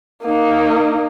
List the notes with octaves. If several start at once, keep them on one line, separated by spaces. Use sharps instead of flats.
A#3 D#4